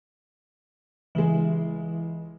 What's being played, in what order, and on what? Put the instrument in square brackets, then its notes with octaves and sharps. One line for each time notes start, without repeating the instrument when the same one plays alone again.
[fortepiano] C#2 G#3 [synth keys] E3